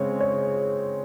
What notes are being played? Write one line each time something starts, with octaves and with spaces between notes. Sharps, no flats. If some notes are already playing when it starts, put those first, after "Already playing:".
Already playing: C#3 G#3 C4 C#5
C#5